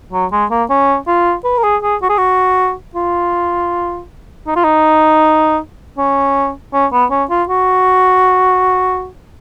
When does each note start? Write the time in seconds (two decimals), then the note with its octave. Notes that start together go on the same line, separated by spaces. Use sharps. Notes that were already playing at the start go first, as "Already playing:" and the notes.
0.13 F#3
0.32 G#3
0.51 A#3
0.70 C#4
1.07 F4
1.44 B4
1.58 A#4
1.63 G#4
1.82 G#4
2.02 F#4
2.09 G#4
2.18 F#4
2.95 F4
4.47 D#4
4.56 F4
4.64 D#4
5.98 C#4
6.73 C#4
6.92 B3
7.11 C#4
7.30 F4
7.49 F#4